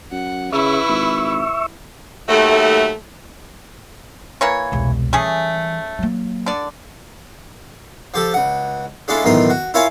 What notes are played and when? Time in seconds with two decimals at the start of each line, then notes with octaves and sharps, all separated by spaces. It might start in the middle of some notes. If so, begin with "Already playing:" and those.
0.12 F#2 F#5
0.52 C#3 E4 B4 E5 C#6 E6
0.88 G#1
2.29 D#2 F#3 A3
4.41 E3 A#3 C#5
4.72 E1 C2
5.13 E3 G3 A3 C#4 G#4
5.99 F#3 A#3
6.46 D3 D5
8.14 F3 G4 A4
8.34 C#2 F#5
9.08 G#3 C#4 D4 E4 F4 A4
9.24 B1 E2 A2 D#3 A#4 C6
9.50 F#4
9.74 E4 F4 A#4 C#5 F5 G#5